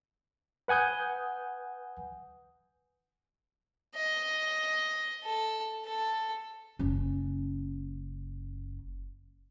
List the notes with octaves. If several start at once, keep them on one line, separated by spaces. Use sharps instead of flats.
B4 F#5 G#5 D#6 G6
D#5
A4
A4
F#1 C#4